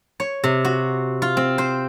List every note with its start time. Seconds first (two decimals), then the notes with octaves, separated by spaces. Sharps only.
0.20 C#5
0.44 C3
0.65 F#4
1.22 F4
1.37 C4
1.58 C5